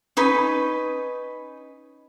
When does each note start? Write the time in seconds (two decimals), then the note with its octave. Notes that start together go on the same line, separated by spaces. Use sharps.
0.17 C#4 D#4 B4